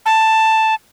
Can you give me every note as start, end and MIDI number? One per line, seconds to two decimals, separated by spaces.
0.06 0.74 81